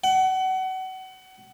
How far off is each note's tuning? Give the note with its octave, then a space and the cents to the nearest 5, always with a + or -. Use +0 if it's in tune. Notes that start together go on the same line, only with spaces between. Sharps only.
F#5 +30